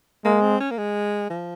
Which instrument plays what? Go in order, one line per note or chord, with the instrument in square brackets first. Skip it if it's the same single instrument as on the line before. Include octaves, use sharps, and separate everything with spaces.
[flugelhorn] G#3 [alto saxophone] A#3
[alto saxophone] C4
C#4
A#3
G#3
F3